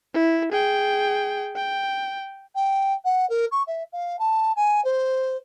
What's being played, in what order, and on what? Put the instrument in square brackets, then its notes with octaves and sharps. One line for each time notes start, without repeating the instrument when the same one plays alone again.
[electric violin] E4
G#4 G5
G5
[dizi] G5
F#5
A#4
C#6
E5
F5
A5
G#5
C5